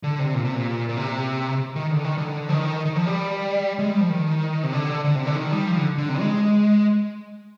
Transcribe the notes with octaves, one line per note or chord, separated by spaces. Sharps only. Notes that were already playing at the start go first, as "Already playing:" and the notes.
D3
C3
A#2
C3
A#2
A#2
C3
D#3
D3
D#3
D3
F3
D#3
D#3
F3
G3
G#3
G3
F3
D#3
C3
D3
D3
C3
D3
D#3
G3
F3
D3
D3
C3
G#3